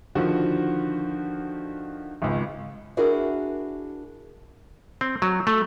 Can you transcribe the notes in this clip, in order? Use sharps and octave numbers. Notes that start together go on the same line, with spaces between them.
D3 D#3 F3 F#4
G#1 C#2
D4 E4 F#4 G#4 A#4
C4
F#3
A3